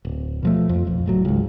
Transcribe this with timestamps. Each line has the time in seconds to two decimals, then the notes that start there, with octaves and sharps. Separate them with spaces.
0.05 D1
0.43 B2 F3 A3
0.69 F2
0.87 B1 F2
1.06 F#1 A2 F#3
1.25 C#2 G#2